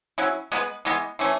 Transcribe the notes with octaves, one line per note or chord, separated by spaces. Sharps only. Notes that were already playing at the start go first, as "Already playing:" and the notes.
F#3 C#4 E4
G#3 B3 F#4 B4
E3 G#3 B3
E3 A3 C#4